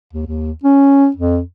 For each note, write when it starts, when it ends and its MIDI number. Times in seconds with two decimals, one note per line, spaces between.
0.13 0.26 39
0.27 0.52 39
0.63 1.08 61
1.16 1.41 41